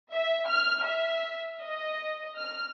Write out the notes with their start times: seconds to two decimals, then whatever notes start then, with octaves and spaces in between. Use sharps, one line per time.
0.12 E5
0.48 F6
0.85 E5
1.62 D#5
2.38 F6